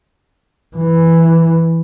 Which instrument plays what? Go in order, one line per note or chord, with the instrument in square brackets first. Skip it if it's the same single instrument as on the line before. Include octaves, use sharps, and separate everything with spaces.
[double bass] E3